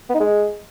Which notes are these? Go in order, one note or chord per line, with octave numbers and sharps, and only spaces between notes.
B3
D#4
G#3